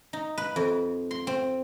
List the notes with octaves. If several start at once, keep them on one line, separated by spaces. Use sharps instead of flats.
D#4
B4
F2
C6
C4